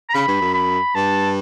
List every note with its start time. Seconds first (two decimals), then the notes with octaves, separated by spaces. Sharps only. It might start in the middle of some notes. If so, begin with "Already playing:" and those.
0.09 A#5
0.14 C#3 B5
0.28 G2
0.41 F#2
0.54 B5
0.94 G2 A5